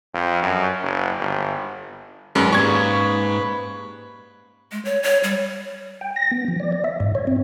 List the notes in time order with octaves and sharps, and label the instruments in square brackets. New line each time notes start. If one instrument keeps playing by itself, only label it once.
[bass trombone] F2
F#2
F#1
G1
[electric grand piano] G#1 F#2 G#3 [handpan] C#4 [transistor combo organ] B4
[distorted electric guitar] G#2 [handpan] A#3 G4 D5 [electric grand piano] C#6 G#6
[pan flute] G#3
C#5
C#5
G3
[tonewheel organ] G5
A#6
B3
F3
D5
D5
E5
G#2
C#5
C4